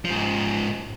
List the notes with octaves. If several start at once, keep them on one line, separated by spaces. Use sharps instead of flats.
G#2 F3